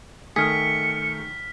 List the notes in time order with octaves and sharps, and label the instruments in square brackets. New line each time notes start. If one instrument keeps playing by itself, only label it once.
[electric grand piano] D#3 A3 [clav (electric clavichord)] G#4 [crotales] F6 B6 [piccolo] C#7